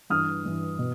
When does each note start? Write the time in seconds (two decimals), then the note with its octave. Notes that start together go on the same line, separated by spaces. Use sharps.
0.10 G2 E3 D#6 F6
0.45 G2 E3
0.79 B2